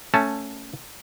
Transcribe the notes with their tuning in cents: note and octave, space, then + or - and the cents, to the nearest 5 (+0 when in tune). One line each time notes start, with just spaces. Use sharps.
A3 +10 C#4 +0 A5 +0